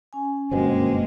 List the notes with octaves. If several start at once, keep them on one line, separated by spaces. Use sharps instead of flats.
C#4 G#5
G1 F#2 B2 G#3 A#3 C4